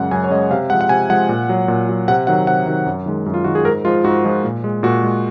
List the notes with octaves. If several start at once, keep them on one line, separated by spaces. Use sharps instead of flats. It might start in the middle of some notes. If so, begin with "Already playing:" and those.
Already playing: F#2 C#3 G#3 F#5
F#2 G#5
C#5
C#3 G#3 D#5
C3 F5
F3 G#3 F#5
F#5
C3 G#5
F3 G#3 F#5
A#2
F#3
A#2
F#3
C3 F#5
D#3 F#3 F#5
C3 F#5
D#3 F#3
F#2
D#3 G#3
F#2
F4
D#3 G#3 F#4
G#4
G#2 A#4
F3 G#3 F4
G#2 F#4
F3 G#3
A#2
G#3
A#2 F#4
G#3